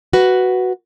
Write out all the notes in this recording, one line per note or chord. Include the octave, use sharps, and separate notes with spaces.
F#4 B4